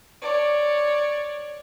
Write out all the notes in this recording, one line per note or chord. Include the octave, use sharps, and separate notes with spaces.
C#5 D5